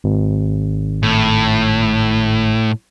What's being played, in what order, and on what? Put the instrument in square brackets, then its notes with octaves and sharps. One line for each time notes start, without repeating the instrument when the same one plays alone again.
[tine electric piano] G#1
[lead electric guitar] A2